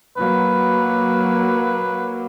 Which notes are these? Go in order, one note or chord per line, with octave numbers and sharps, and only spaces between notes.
F#3 A#3 B4